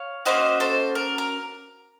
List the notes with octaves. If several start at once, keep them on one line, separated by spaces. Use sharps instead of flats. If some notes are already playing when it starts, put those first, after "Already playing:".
Already playing: C#5 F5
A#3 C#4 F#4 C5 D#5
A4 C5
A#4
A#4